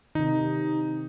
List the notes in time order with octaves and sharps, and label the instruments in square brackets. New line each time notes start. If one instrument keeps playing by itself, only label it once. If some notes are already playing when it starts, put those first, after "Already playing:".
[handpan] C3 D#3 [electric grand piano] D#4